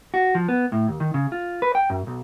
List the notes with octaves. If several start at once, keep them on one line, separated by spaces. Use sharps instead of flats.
F#4
F3
B3
A2
D#2
D#3
C#3
F4
B4
G5
F#2
B1